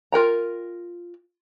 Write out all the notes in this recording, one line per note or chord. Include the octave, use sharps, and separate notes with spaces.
F4 A#4 G5 A#5